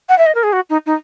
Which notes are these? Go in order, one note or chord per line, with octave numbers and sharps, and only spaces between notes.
F#5
E5
D#5
A#4
G#4
F#4
D#4
D#4